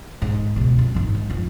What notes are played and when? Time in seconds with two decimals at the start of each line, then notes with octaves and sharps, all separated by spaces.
0.22 G#2
0.56 C#2 B2
0.79 F#2
0.94 G#1 F#2
1.15 G#3
1.30 F1 F4